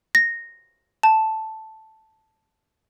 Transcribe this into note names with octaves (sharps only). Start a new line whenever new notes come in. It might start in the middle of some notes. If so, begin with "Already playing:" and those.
A#6
A5